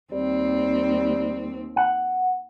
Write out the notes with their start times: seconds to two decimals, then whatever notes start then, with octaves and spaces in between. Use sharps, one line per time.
0.12 D#2 G3 C4
1.76 F#5